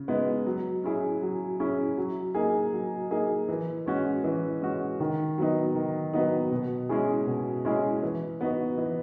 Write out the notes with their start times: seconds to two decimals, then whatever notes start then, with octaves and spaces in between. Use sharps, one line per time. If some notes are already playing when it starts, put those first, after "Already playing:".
Already playing: C#3
0.08 G#3 B3 D#4
0.46 F#3
0.84 C#4 E4 G#4
1.22 F#3
1.60 C#4 E4 G#4
1.98 F#3
2.35 A#3 D#4 G#4
2.73 F#3
3.11 A#3 D#4 G#4
3.49 E3
3.86 G#3 C#4 F#4
4.24 E3
4.62 G#3 C#4 F#4
5.00 D#3
5.38 F#3 B3 D#4
5.75 D#3
6.13 F#3 B3 D#4
6.51 B2
6.89 G#3 C#4 E4 G#4
7.27 B2
7.65 G#3 C#4 E4 G#4
8.03 E3
8.41 B3 D#4 F#4
8.78 E3